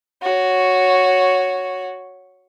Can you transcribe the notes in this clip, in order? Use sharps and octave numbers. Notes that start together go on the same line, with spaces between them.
F#4 C#5